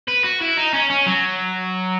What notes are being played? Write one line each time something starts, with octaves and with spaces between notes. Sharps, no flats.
B4
F#4
E4
D#4
C#4
C#4
F#3